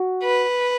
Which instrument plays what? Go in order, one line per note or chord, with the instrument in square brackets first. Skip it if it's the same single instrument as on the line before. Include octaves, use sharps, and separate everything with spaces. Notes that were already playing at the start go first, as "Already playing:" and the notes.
Already playing: [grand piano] F#4
[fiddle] B4